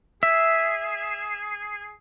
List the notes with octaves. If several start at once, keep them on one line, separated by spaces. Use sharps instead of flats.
G#4 E5